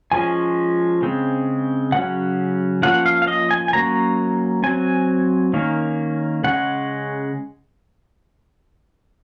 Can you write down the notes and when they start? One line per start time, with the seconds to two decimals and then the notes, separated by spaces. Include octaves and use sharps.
0.12 F3 G#3 C#4 G#5
1.02 C#3 G#3 C4
1.92 C#3 F#3 C#4 F#5
2.83 F3 A#3 C#4 F#5
3.06 F5
3.22 F5
3.27 D#5
3.51 G#5
3.68 G#5
3.73 F#3 A#3 C#4 A#5
4.63 F#3 C4 G#5
5.54 D#3 A#3 C#4
6.44 C#3 G#3 C#4 F#5